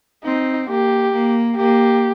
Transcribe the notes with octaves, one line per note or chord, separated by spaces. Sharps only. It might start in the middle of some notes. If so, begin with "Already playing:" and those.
C4 D#4
A#3 G4
A#3
A#3 G4